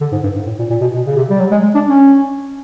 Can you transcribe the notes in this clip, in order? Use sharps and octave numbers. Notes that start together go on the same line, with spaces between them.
D3
G#2
G2
G#2
A2
A#2
A#2
B2
B2
C#3
C3
G3
F#3
G#3
G#3
D4
C#4